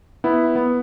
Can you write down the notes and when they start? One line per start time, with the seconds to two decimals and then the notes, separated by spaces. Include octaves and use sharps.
0.24 B3 E4
0.55 B3